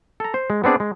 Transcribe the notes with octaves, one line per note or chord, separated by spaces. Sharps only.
A4 A#5
C5
G#3
B3 C4 D4 G#4 D5
G#3